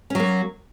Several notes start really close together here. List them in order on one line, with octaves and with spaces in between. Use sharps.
C#4 F#3 A#3